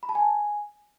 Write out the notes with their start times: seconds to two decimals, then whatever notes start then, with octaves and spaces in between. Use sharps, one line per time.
0.03 B5
0.09 A5
0.15 G#5